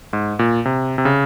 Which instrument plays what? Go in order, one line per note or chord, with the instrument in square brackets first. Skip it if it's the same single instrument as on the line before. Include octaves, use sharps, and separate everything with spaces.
[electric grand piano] G#2
A#2
C3
C3
C#3